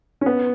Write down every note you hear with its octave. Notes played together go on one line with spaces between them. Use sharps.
C#4
B3